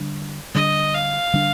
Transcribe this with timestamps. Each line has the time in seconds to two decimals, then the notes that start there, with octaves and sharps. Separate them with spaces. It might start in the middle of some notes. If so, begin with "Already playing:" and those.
Already playing: D3 G3 D4
0.54 D3 G3 D4 D#5
0.94 F5
1.34 D3 G3 D4